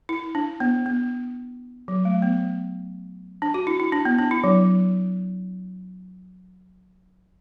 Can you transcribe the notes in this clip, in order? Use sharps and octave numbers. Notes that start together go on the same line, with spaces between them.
E4
D4
B3
B3
F#3
A3
B3
D4
F#4
E4
E4
D4
B3
D4
E4
F#3